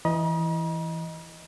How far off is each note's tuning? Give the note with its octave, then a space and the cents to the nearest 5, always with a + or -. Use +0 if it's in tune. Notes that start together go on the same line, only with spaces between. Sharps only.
E3 +0 D#5 +0 A#5 +45